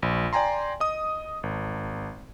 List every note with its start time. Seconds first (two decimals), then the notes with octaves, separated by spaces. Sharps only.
0.02 A#1
0.33 D5 G5 G#5 A#5 C6
0.80 D#5 D#6
1.43 G#1